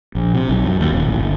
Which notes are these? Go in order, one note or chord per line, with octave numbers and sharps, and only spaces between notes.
A#1
C3
B1
F#2
D#2
D#1
A1
G1